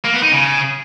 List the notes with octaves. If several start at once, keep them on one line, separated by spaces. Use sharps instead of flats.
A#3
B3
D#4
C#3